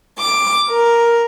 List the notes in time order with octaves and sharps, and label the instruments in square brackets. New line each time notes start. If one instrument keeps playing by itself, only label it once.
[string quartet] D6
A#4